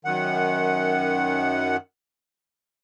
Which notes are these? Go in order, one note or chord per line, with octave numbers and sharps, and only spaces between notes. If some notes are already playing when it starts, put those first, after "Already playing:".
F#2 D#3 F#5